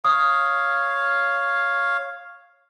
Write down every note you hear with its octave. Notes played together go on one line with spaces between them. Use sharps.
C#5 F5 D#6